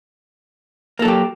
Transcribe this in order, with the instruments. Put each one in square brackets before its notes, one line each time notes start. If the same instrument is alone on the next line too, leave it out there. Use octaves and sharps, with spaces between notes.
[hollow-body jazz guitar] A#3
A4
F#3
G4